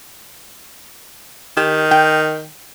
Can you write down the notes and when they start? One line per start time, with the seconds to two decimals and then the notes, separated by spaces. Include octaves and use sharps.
1.57 D#3 G4
1.91 G5